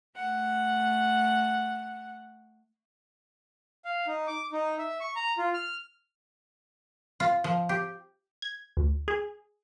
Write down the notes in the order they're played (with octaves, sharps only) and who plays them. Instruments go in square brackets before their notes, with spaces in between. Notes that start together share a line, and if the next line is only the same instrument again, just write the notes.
[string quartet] A3 F#5
[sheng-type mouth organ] F5
D#4
D6
D#4
E5
C#6
A#5
F4
F6
[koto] F4
F3
G4
[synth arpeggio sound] G#6
D2
G#4